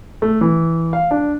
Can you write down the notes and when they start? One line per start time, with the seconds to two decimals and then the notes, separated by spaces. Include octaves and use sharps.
0.22 A3
0.41 E3
0.93 F5
1.11 D4